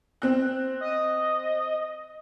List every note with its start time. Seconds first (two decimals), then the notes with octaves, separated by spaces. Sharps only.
0.22 C4 F#6
0.81 D#5